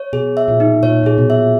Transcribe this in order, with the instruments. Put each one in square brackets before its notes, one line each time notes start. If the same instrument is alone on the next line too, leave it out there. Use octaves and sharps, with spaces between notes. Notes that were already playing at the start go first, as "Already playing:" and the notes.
Already playing: [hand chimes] C#5
[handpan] B2 [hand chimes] G#4
[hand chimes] E5
[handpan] A#2
[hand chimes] D#4
[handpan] A#2 [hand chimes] C#5
[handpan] A#2
[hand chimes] G#4
[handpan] B2
[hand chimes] E5